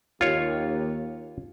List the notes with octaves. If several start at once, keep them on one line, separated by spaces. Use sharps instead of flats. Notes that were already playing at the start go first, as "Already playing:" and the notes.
D#2 F4 C#5